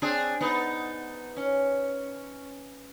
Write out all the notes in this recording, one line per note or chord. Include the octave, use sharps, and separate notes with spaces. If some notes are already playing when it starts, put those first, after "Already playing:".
C4 D4 G#4
B3 D#4
C#4